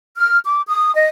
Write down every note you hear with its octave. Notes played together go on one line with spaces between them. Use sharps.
F6
D6
D#6
D#5